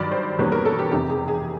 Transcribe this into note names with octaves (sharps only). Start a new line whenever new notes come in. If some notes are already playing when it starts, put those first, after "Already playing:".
Already playing: G2 D#3 F#3 D5
C5
E2 B2 G3 A#3 C#4 B4
A#4
A4
G4
F1 E2 C3 G4
G#4
G#4